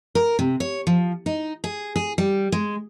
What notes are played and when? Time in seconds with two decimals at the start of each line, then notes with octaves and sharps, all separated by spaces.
0.15 A#4
0.39 C3
0.60 C#5
0.87 F3
1.26 D#4
1.64 G#4
1.96 G#4
2.18 G3
2.52 G#3